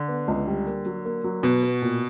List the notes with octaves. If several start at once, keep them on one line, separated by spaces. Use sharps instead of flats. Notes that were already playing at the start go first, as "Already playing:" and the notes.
Already playing: D3
B3
C#2
G3
A#3
F#3
A#3
F#3
B2 B3
B3
A#2